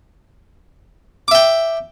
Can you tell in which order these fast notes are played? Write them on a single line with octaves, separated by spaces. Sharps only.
D6 E5 G5